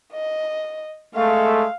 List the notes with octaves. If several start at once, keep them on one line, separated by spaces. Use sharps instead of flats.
D#5
G#3 A3 F5